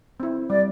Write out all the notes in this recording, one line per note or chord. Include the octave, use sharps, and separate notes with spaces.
C4 E4
G3 D5